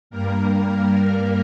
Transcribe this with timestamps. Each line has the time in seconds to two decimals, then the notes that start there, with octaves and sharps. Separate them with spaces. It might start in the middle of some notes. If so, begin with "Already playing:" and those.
0.10 G2 G3 A#3 A#4